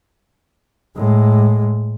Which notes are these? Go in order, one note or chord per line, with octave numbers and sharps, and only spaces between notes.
A2 G#3